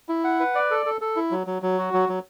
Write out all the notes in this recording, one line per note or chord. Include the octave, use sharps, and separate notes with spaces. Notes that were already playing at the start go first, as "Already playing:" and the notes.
E4
F#5
B4
D5
A4
A4
A4
E4
F#3
F#3
F#3
F#4
F#3
F#3